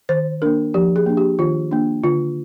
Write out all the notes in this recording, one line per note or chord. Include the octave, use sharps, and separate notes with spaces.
D#3 C5
A#3 D4 A#4
F3 G4
G#4
A#3 D4
G4
D#3 F4
A#3 D4
D3 F4